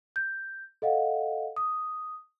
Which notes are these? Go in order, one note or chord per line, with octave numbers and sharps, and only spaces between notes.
G6
A4 D#5 F5 F#5
D#6